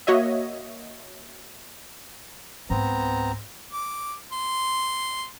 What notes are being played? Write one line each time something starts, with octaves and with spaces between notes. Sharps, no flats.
A#3 F#4 C#5 D#5 E5
C#2 G#2 B3 C4 A#5
D6
C6